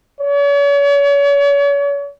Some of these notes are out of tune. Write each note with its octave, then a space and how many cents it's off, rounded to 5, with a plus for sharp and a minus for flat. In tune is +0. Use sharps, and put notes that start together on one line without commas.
C#5 +40